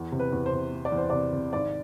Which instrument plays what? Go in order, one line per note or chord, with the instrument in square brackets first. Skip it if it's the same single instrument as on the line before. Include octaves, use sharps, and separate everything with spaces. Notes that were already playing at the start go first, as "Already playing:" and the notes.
Already playing: [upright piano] E2
C3
B4
E2
C5
C3
E3
D5
E2
C5
C3 D5
C3
G#1 D5